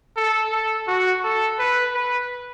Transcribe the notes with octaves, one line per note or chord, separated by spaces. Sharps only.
A4
A4
F#4
A4
B4
B4